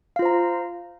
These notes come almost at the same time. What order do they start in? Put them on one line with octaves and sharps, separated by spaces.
F5 F4 C5 A#5